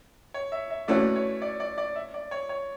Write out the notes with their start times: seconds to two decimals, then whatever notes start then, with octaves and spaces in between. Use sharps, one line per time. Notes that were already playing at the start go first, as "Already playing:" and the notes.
0.34 C#5
0.52 E5
0.70 E5
0.88 E3 A3 C#4 F#4 D5
1.15 C#5
1.42 D5
1.60 D5
1.78 D5
1.96 E5
2.14 D5
2.31 C#5
2.49 C#5